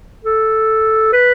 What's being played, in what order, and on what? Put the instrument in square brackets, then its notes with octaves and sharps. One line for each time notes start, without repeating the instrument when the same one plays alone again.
[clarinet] A4
B4